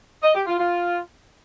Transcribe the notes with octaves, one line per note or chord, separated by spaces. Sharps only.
D#5
G4
F4
F4